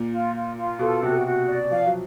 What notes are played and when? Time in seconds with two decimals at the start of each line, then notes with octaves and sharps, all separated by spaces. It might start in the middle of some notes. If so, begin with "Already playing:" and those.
Already playing: A#2
0.12 F4
0.35 F4
0.56 F4
0.79 B2 A4
1.02 C3 F#4
1.26 F#4
1.47 D5
1.71 F3 F5
1.86 F#3